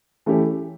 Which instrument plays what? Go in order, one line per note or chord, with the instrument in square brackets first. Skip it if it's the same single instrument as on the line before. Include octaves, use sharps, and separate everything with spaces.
[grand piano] E3 A3 C#4 G4